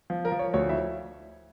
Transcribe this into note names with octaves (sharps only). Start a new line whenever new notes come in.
F3
A#4
F3
C#5
D2 C#5
E4 E5